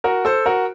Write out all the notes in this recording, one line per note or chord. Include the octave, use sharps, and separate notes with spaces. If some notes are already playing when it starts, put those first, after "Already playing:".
F#4 A#4
A4 C5
F#4 A#4